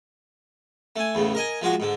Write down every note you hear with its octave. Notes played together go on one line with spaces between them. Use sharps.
A3 G#5
E2 A2 C#3
A#4 D#5 G#5
F3 G#3 F4 F#4
G#2 D3